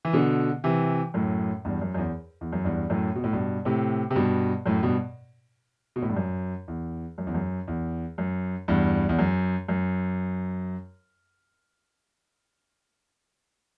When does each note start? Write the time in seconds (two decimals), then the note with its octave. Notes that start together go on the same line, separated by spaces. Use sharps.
0.05 E3
0.13 B2 D3
0.64 C3 E3
1.14 F#2 A2
1.65 E2 G2
1.81 F#2
1.94 F#2
1.98 E2
2.41 E2
2.52 F#2
2.64 E2 G2
2.90 F#2 A2
3.15 B2
3.24 A2
3.33 G2 B2
3.65 A2 C3
4.10 C3
4.16 G2 B2
4.66 F#2 A2
4.83 G2 B2
5.96 B2
6.02 A2
6.09 G2
6.16 F#2
6.68 E2
7.18 F#2
7.27 E2
7.34 F#2
7.68 E2
8.18 F#2
8.68 E2 G2
9.09 E2
9.19 F#2
9.68 F#2